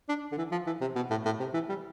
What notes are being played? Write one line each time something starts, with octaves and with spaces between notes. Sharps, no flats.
D4
D3
E3
F3
E3
C3
B2
A2
A2
C3
E3
G3